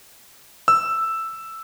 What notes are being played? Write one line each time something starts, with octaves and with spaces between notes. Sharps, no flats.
E6